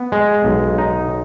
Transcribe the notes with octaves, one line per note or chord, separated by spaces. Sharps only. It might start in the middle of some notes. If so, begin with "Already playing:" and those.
Already playing: B3
G#3
B1
D#4